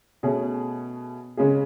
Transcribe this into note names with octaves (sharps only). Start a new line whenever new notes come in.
B2 A3 C#4 G#4
C#3 G#3 C#4 G#4